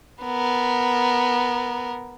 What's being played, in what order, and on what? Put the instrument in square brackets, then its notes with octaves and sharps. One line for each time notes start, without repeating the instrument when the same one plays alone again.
[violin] B3 A#4